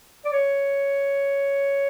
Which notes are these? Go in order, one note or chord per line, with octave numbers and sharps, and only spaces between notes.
D5
C#5